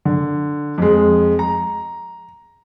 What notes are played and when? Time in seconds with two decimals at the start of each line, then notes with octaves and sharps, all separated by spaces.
0.05 D3
0.78 F2 G#3
1.39 A#5